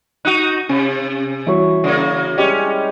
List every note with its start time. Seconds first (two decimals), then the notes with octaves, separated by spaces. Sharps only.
0.25 D#4 F#4 F#6 D#7
0.69 C3 C#4
1.47 E3 G3 E4 F#4 C#5
1.84 C#3 A#3
2.38 G3 G#3 C#4 G4